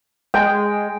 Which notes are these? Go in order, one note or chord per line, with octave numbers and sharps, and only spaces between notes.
G#3 G5